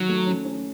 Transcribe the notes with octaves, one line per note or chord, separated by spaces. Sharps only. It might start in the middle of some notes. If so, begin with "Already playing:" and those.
Already playing: D#3 F#3
A3
C#4
C#4